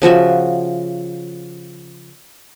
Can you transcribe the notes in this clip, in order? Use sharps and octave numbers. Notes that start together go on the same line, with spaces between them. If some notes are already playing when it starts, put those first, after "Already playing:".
C#3 F3 F#4 E5